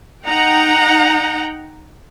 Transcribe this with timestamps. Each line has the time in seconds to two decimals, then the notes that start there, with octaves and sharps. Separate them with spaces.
0.26 D#4 F#5 G5 A#5